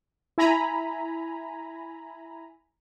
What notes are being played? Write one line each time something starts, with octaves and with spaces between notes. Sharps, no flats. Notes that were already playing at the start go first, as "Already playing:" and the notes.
E4 G#5 A#5 B5